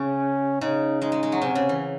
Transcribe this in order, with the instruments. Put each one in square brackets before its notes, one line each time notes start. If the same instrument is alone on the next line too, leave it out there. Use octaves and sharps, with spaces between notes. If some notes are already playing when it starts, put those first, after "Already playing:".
Already playing: [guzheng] C#3 [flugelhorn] C#4
[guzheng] C#3 [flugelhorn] D#4
[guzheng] G#3 [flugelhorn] D#4
[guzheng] G#3
G#3
F#3
[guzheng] C3 [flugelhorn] C#4
[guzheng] C#3
E3